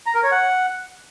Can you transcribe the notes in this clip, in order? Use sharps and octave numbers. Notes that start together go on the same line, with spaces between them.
A#5
A#4
C#5
F#5